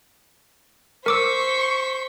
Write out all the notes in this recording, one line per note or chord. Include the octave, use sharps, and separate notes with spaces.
A#4 C5 C#6 D6 E6 B6